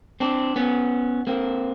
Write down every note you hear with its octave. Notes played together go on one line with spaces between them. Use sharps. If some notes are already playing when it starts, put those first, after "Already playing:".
C4 D4
B3 C#4
A#3 C4